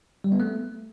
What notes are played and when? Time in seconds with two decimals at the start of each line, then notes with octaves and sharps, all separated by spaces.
0.24 G3
0.32 B3
0.40 A3